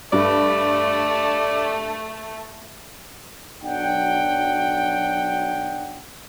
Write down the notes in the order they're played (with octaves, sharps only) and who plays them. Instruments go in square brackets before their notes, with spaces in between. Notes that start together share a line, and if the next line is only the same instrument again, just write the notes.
[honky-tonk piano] G2 [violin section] A3 [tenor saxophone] D5
[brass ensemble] B1 F#3 D4 F#5 G5